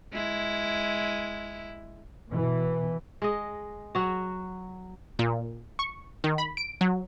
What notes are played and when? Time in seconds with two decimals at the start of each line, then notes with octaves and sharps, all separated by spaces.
0.13 G#3 E4
2.30 B2 E3
3.22 G#3 D#5
3.95 F#3 F#4
5.19 A#2
5.79 C#6
6.24 D#3
6.38 B5
6.57 D7
6.81 F#3